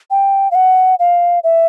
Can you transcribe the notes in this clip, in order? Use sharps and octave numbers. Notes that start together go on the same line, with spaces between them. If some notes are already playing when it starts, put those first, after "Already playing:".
G5
F5
F#5
F5
E5